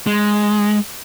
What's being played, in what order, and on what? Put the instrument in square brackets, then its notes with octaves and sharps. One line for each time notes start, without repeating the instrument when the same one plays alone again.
[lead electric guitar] G#3